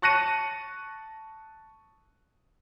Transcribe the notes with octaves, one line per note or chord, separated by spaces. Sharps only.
A5 C#6 F#6 A#6 C#7 D#7